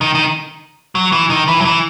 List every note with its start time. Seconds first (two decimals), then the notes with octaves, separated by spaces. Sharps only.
0.01 D#3
0.15 D#3
0.95 F#3
1.12 E3
1.30 D#3
1.48 E3
1.61 F#3
1.65 E3